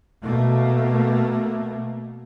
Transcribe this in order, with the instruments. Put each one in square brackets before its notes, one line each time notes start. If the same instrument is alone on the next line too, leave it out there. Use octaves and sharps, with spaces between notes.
[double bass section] B2 A3 A#3